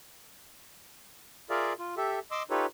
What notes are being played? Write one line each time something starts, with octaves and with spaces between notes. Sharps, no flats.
F4 G#4 A#4 D5 E5 F5
F4
G4 A4 E5
D#5 C6 D6 E6
D#4 F4 G4 A4 B4 C#5